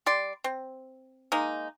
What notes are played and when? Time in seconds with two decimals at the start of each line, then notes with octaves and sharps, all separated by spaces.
0.06 G3 D5 C6
0.44 C4
1.32 G#3 A#3 D#4